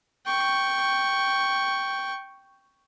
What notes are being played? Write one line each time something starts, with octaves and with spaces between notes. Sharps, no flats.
G5 C#6